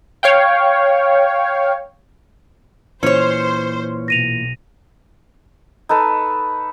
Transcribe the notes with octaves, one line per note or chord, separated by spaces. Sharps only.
C#5 F5 G5
A#2 E3 C#4 C5 C#5
B1 A#6 D#7 F7
D#4 A4 B4 A5